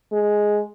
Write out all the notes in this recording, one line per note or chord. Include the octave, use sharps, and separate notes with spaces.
G#3